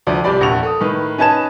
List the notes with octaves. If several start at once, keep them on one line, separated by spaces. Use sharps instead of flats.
D2 F3 D5
C2 G3 G4 D5 B5
E1 A#1 F#5 C#6 F7
A4 D#6
A2 D#3 B4
C#4 D#4 B4 A5 G#6 E7